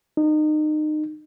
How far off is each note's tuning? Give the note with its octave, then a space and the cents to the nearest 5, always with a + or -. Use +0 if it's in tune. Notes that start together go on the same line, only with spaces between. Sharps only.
D#4 -30